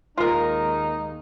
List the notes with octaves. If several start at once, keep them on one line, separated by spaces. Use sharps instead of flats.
D#2 G#3 D#4 F4 A#4